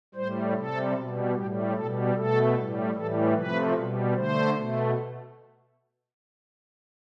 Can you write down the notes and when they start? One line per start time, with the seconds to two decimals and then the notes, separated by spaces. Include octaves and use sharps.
0.15 A2 G3 C5
0.54 C3 G3 A4
0.95 B2 G3
1.34 A2 G3 G4
1.75 B2 G3 A4
2.15 B2 A3 A4
2.55 A2 G3
2.94 A2 E3 G3 A4
3.34 C3 F3 A3 B4
3.74 B2 G3
4.14 D3 A3 C5
4.54 B2 A3